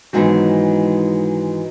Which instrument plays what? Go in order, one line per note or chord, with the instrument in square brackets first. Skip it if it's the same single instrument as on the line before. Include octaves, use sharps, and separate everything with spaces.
[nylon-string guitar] G#2 E3 G#3 B3 D#4 [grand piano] D#3 F#3